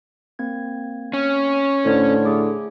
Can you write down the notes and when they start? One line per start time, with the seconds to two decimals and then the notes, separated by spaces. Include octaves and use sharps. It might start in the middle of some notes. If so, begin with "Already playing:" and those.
0.39 A#3 C4 G#6
1.13 C#4
1.86 A2 D3 C5 C#5 G#6
2.25 A3 G#4 D6